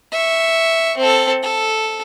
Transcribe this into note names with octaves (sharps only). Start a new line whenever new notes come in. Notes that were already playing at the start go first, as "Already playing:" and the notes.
E5 C#6
C4 A4
A4